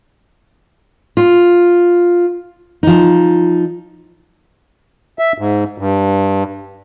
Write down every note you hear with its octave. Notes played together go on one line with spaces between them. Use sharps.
F4
F3 D#4
E5
G#2
G2